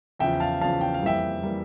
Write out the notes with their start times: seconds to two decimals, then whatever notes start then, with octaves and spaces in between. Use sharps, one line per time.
0.19 E2 C#3 F3 E5 G5
0.40 F5 A5
0.61 E2 C#3 F3 F5 A5
0.81 G5
0.94 F5
1.02 F2 E3 G3 A#3 E5 G5
1.43 E3 G3 A#3